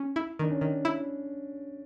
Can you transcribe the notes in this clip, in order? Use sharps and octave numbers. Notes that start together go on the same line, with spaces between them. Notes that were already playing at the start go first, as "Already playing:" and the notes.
Already playing: C#4
E4
D#3 D4
C#4
D#3
E4